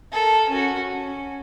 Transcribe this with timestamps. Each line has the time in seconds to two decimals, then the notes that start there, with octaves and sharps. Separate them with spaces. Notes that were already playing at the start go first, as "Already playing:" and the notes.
0.12 A4 A#4
0.49 C#4 F#4
0.92 C#4